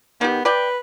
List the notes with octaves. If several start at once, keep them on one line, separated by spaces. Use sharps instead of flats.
D#3 B3 G4
B4 D5 G5